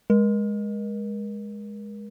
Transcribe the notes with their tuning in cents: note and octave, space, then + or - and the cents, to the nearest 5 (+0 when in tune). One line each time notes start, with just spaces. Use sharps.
G#3 +0 A#4 +35